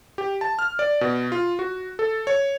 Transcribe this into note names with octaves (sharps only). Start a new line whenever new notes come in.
G4
A5
F6
D5
B2
F4
F#4
A4
C#5